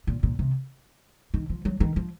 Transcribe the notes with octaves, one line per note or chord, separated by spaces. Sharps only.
A#2
A#2
C3
D#3
F3
F#3
D#3
F3